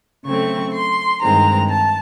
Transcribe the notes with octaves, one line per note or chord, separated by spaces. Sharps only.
C#3 F#3 A3 C4 C#6
C6
G2 D#3 G#3 C4 A#5
A5